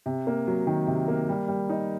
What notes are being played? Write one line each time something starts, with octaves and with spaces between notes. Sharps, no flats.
C3
A#3
F#3
D#3
C3
A#3
G3
G3
D#4